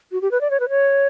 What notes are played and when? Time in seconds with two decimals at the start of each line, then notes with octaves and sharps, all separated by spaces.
0.12 F#4
0.22 G4
0.31 B4
0.41 D5
0.50 C#5
0.60 B4
0.69 C#5